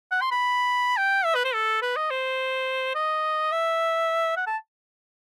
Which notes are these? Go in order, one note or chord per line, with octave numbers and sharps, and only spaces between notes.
F#5
C6
B5
G5
E5
B4
C5
A4
B4
D#5
C5
D#5
E5
F#5
A5